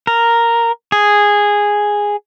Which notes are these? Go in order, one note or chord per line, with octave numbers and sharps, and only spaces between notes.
A#4
G#4